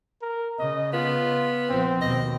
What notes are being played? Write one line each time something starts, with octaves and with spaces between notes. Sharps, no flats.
A#4
C#3 D#5
B3 F4
A#1 F3 C4
D#2 B2 D#5